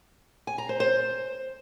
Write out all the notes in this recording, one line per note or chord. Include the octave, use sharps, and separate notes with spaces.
G#5
A#5
C5
C5